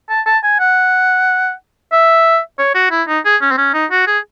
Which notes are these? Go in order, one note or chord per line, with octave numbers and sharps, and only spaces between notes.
A5
A5
G#5
F#5
E5
C#5
F#4
E4
D#4
G#4
C#4
C4
C#4
D#4
F#4
G#4